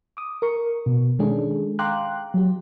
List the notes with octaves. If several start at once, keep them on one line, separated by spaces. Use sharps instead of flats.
D6 D#6
A#4 C#6
B2
D#3 G#3 C#4 D4 G#4 A4
F5 G5 A#5 C6 D6 F#6
F#3 G4